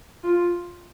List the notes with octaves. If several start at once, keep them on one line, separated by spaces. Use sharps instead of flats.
F4